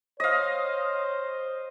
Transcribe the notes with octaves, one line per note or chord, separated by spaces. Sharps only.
C5 C#5 D#5 F5